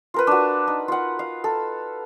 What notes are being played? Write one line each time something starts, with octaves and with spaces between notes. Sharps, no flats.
F4 A#4 B4
D4 F#4
D#4
F4 F#5
F5
A4